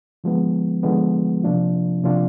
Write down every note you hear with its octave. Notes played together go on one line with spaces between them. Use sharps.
D3 F3 G#3 B3
D3 F3 G#3 B3
C3 F3 A#3 D4 F4
C3 F3 A#3 D4 F4